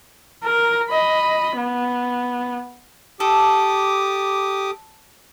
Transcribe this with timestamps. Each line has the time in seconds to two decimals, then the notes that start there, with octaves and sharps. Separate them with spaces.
0.43 A#4
0.90 D#5 B5
1.57 B3
3.20 G4 A4 D6 D#6